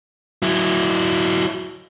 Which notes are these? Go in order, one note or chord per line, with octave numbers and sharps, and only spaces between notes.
F#3 E4